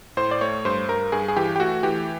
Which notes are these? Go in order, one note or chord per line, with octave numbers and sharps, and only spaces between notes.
A2 C5
D5
A3 C#5
G2 C5
G2 A#4
G2 G#4
G#4
E3 G4
G4
A3 F#4
E3 G4